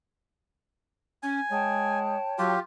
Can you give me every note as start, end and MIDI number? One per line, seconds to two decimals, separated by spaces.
1.23 1.40 61
1.23 1.99 80
1.50 2.16 56
1.50 2.52 73
1.50 2.52 79
1.50 2.52 81
2.39 2.56 54
2.39 2.59 65
2.39 2.59 67